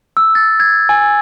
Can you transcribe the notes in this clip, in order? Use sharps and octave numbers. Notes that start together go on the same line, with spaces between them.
E6
A6
G#6
G#5